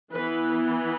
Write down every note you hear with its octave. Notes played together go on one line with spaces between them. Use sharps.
E3 B3 B4
B4